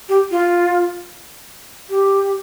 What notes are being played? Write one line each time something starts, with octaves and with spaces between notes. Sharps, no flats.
G4
F4
G4